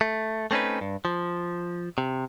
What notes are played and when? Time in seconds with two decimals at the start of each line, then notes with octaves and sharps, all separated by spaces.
0.01 A3
0.51 A3 C4 C#4 D#4 B4
0.81 G2
1.05 F3
1.98 C3